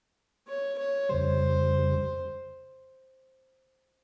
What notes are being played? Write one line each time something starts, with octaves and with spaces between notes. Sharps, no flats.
C#5
C#5
F2 C#3 G3 C5